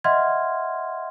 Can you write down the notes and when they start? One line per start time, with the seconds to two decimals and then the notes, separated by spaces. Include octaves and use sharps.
0.04 D#5 E5 F#5 C6 F6 G#6